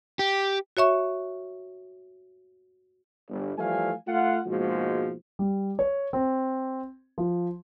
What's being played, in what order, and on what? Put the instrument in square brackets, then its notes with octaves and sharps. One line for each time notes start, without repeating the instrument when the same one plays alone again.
[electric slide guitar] G4
[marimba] F#4 C#5 E5 C#6
[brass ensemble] G1
E3 F3 G3 A3 F5 G#5
A3 F4 F#5
G#2 B2 F3 G#3 A#3 F#4
[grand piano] G3
C#5
C4
F3